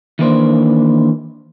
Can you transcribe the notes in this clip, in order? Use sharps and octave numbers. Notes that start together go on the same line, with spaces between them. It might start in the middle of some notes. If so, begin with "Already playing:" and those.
D#3 E3 A#3 D4 B4 C5